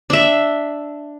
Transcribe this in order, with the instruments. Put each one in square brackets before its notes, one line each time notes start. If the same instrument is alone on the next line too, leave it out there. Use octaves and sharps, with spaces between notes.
[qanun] D4 E5